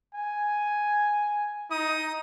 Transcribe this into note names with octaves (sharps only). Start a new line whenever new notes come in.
G#5
D#4 D#6